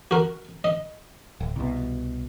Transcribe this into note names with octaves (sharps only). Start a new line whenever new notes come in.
F#4 A#4
D#5
D1
C2 B2